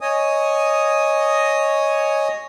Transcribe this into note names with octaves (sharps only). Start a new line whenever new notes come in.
C#5 D#5 G#5 D#6